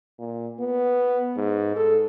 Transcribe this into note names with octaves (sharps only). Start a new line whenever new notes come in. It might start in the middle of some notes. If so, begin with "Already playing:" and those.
A#2
B3
G#2
A4